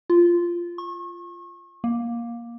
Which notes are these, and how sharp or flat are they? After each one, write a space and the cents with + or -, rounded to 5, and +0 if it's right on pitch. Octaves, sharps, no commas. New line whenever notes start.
F4 -10
C#6 -35
A#3 +15